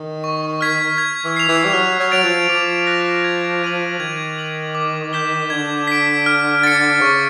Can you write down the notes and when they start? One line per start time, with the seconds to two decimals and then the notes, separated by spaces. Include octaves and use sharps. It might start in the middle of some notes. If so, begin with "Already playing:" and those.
Already playing: D#3
0.24 C#6
0.61 F6 G#6 B6
0.98 G#6
1.24 E3
1.36 C7 F7
1.48 E3
1.65 G3
1.73 F#3 F6
2.00 F#3
2.11 F#3 A6 D7 F7
2.23 F3
2.49 F3 D6
2.87 F#6 A#6
3.24 G#6
3.62 B6 D#7 F#7
3.99 D#3 G#6
4.37 B6 D#7 F#7
4.75 D6
5.13 G6 B6 E7 G7
5.50 D3 G#6
5.88 B6 D7
6.26 F6
6.63 A6 C#7
7.01 C#3 C#6